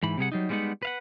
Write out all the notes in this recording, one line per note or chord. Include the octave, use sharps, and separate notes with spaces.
G#2 E3 B5
C3 G3 G#4 F#5
F#3 G3 D#4
G3 G#3 B3 D4 D#4 F#5
B4 F5 F#5